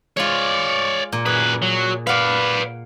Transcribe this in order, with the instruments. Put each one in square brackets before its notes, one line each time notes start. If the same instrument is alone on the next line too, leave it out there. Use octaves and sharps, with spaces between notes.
[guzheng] G#3 F4 [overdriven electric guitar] C#5 D5
[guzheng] A#2
[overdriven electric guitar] F#2 B4 [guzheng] G#4
[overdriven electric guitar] F#3
[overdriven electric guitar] B4 D5 [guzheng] F5 F#5